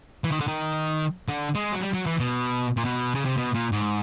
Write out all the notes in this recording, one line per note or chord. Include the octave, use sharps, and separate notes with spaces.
E3
D#3
D3
D#3
D3
G#3
F#3
G3
F#3
E3
B2
A#2
B2
C#3
C3
B2
A#2
G#2